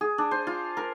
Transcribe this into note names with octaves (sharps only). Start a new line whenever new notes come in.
G#4
D4
C5
F4
A#4